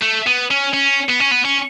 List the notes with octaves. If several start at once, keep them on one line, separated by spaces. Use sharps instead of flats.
A3
B3
C#4
C#4
B3
C#4
B3
C#4